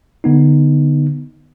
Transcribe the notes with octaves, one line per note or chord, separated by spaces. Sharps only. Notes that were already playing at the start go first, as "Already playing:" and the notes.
D3 B3 D#4